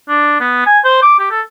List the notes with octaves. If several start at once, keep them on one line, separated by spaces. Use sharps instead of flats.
D4
B3
G#5
C5
D6
G4
A4